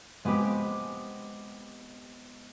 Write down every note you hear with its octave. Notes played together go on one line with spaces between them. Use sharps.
G#3 B3 C4 G4